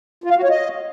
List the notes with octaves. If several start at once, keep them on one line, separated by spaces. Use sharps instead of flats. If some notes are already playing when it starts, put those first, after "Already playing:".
F4
F5
F#4
C#5
D#5